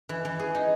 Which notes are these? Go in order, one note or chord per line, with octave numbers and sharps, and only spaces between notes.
E3
E3
G#4
D#4